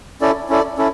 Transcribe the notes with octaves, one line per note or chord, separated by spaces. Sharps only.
C#4 E4 A4 D5
C#4 E4 A4 D5
C#4 E4 A4